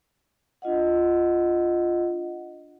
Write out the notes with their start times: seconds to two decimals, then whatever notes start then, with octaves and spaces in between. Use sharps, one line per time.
0.62 D4 F4 D#5 F#5